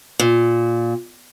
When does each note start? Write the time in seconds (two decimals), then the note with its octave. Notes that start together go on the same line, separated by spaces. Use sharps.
0.19 A#2